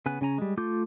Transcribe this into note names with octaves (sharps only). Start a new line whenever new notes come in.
C#3 B3 G#5 F#6
C#3 C#4 G#5 A#5
G3 G#3
A3 F4 D6 G6